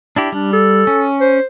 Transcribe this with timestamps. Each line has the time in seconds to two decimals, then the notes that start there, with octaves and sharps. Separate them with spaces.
0.16 D4 E4 G4
0.32 G3 D4
0.53 A4
0.87 C#4
1.20 C5